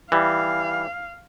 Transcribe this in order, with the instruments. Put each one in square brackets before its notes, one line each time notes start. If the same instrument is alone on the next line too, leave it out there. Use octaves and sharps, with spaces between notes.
[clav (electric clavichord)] E3 G3 [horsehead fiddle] F5